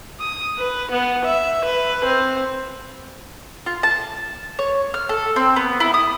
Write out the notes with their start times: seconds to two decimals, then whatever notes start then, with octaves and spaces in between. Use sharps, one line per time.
0.20 D#6
0.58 B4
0.91 B3
1.25 E5
1.65 B4
2.05 C4
3.66 F4
3.83 A5
4.59 C#5
4.94 F6
5.09 A4
5.36 C4
5.56 B3
5.80 E4
5.94 D#6